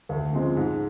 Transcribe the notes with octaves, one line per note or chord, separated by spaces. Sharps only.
D2
C#3 F3 G#3 C4
G#2